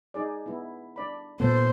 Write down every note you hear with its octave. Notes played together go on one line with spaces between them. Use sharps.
D#4 G#4 D5
B3 E4
D4 D5 B5
A#2 B3 A4 C5